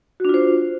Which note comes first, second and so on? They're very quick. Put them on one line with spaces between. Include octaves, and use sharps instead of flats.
F#4 D4 F4 C5